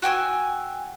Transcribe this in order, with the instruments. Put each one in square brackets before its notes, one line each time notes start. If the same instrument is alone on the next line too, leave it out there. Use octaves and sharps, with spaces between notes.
[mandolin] F#4 G5 G#5 E6